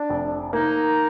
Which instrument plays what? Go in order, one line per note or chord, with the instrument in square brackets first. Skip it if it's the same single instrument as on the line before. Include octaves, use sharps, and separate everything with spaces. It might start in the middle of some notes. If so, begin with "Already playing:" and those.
Already playing: [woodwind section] D4
[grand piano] F1
[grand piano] A#3 [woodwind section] D#4